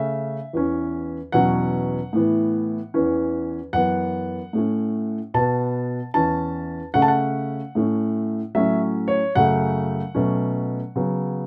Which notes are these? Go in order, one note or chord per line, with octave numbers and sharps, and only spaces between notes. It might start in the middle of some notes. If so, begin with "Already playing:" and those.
Already playing: C#3 A3 C#4 E5
E2 E3 C#4
E2 B2 F#3 C#4 F#5
A2 E3 B3
E2 E3 C#4
F#2 E3 B3 F#5
A2 A3 C#4
B2 B3 A5
E2 E3 C#4 A5
C#3 A3 C#4 F#5
A5
F#5
A2 A3 C#4
A2 F#3 A3 C#4 E5
C#5
F#2 C#3 F#3 A3 F#5
B2 F#3 A3 C#4
C#3 F#3 B3